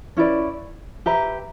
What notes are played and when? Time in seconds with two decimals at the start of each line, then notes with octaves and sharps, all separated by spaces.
0.17 C#4 E4 B4 D5
1.06 G4 B4 E5 A#5